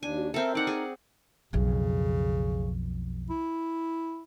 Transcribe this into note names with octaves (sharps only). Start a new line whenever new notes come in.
D#2 D4 G#5
F#4
C4 A4 A#4 E5
D#4 D5 F#5
G#4
B1 F2 C#3
E4